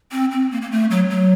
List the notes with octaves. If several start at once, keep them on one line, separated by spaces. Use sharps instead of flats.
C4
C4
A#3
A#3
A3
F#3
F#3